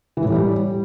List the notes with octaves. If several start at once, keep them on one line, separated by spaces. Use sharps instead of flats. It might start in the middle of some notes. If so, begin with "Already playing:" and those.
E3
A2
G3